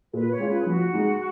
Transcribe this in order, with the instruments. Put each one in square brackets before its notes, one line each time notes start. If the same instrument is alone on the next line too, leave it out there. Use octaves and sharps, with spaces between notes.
[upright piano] A#2 [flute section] B4
[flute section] C#5
[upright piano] G#3 C#4 F4
[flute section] B4
G#4
[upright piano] F3 [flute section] F#4
[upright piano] G#3 D#4